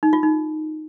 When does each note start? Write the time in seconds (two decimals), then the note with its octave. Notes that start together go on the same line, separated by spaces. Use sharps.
0.03 D#4
0.13 F4
0.23 D#4